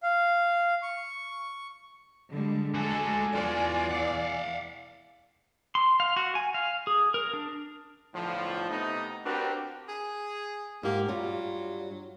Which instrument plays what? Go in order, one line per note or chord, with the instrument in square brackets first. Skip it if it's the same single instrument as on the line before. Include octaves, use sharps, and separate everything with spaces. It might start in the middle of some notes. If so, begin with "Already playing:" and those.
[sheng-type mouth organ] F5
C#6
[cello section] D3 G3 G#3
[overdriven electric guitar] D3 F#4 [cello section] G#3 A4 [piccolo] G#5
[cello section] E2 D5 [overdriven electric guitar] F4 F#4
[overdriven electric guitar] F5 F#5
[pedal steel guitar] C6
F5
F#4
G#5
F5
G#4
A#4
D4
[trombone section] B1 A2 D3 F3
C3 A3 B3 D#4
C4 D4 F#4 G4 A#4 B4
[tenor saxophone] G#4
[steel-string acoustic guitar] G#2 G4 [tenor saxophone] A#3
[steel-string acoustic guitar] G2 G3 F4 [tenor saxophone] F#3